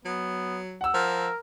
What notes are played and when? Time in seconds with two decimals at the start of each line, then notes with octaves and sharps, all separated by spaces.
0.05 F#3 B3
0.81 F#5 E6
0.94 F3 A#4